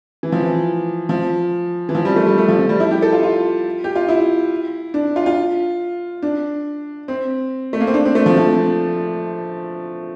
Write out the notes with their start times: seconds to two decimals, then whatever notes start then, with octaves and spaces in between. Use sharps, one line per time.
0.23 E3
0.32 F3
0.43 E3
1.09 F3
1.89 E3
1.95 F3
2.05 G3
2.16 A3
2.27 G3
2.38 A3
2.48 F3
2.59 F3
2.69 G3
2.80 E4
2.91 G4
3.02 A4
3.13 F4
3.23 F4
3.84 G4
3.96 F4
4.09 E4
4.94 D4
5.16 F4
5.26 F4
6.23 D4
7.08 C4
7.73 A3
7.80 A#3
7.87 C4
7.94 D4
8.05 C4
8.15 A3
8.26 F3
8.36 F3